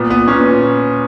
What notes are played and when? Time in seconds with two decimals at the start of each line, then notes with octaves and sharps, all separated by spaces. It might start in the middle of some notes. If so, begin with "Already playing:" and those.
Already playing: A#2 B3
0.10 B3
0.28 A#2 C#4